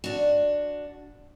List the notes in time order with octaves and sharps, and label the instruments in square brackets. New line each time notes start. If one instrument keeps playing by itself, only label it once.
[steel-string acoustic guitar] D4 F#4